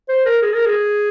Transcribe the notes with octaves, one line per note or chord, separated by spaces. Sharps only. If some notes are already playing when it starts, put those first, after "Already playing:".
C5
A#4
G#4
A#4
G#4